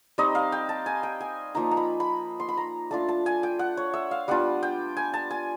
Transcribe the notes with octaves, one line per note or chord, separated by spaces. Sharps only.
G3 C4 D#4 D#5
F5
G5
A5
G#5
G5
G#5
F3 A#3 D#4 A#5
A#5
B5
B5
C6
B5
A#5
A3 D4 F4 A5
A5
G#5
G5
F#5
C#5
E5
F5
G3 B3 D4 F4 F#5
G5
G#5
A5
G#5